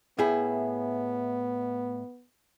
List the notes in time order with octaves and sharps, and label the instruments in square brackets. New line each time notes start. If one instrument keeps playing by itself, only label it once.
[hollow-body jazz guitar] A2 E4 G#4 [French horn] B3